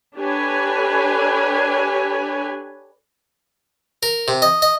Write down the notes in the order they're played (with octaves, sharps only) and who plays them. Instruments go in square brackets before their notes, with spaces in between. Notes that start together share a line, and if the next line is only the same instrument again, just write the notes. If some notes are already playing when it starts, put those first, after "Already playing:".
[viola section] D4 G4 A4 B4 C#5 G#5
[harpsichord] A#4
C3
D#5
D#5